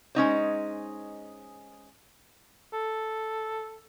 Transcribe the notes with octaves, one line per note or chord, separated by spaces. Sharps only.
G#3 C#4 D#4 C5
A4